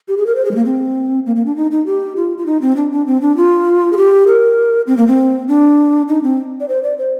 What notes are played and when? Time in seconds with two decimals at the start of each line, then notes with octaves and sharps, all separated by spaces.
0.08 G4
0.17 G#4
0.26 A#4
0.35 C5
0.45 G#4
0.51 G#3
0.55 A#3
0.65 C4
1.26 A#3
1.36 A#3
1.46 D4
1.56 D#4
1.71 D#4
1.86 G4
2.16 F4
2.38 F4
2.46 D#4
2.61 C4
2.76 D4
2.92 D4
3.06 C4
3.22 D4
3.37 F4
3.93 G#4
3.97 G4
4.27 A#4
4.87 C4
4.97 A#3
5.08 C4
5.48 D4
6.08 D#4
6.23 C4
6.60 D5
6.68 C5
6.83 D5
6.98 C5